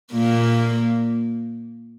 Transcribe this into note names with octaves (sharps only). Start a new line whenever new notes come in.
A#2 A#3